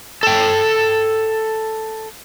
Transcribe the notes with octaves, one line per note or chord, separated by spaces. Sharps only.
A4 G5